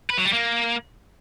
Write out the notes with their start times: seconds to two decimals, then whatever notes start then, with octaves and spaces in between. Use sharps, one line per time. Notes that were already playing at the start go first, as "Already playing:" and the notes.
0.10 B4
0.18 F#3
0.25 G3
0.33 A#3